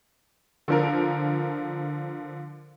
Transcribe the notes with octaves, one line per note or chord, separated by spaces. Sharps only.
D3 F3 A#4